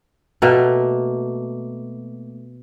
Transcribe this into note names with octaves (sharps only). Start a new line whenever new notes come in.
B2 A3 A#3